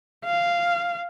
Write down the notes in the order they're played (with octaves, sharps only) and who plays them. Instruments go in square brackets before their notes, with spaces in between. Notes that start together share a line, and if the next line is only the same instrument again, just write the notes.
[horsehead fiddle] F5